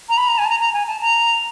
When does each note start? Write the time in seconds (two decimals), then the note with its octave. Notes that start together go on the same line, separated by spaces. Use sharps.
0.09 A#5
0.18 B5
0.28 A#5
0.38 G#5
0.45 A5
0.50 A#5
0.60 A#5
0.74 G#5
0.88 A5
1.02 A#5